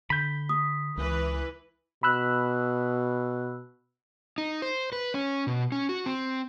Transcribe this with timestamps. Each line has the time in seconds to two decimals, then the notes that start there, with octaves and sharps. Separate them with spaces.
0.10 D3 B5 G6
0.49 D#6
0.97 C#2 E3 B4
2.03 B2 B5 E6 F#6
4.38 D#4
4.62 C5
4.92 B4
5.14 C#4
5.47 B2
5.72 C#4
5.89 F#4
6.06 C4